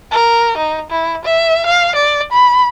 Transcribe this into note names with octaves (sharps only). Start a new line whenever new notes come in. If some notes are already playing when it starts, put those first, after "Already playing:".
A#4
D#4
E4
E5
F5
D5
B5